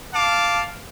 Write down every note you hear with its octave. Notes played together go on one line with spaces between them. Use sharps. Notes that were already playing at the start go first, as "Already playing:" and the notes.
F5 A5 D6